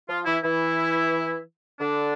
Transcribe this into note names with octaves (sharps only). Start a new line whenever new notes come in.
F3 F4
E3 E4
E3 E4
D3 D4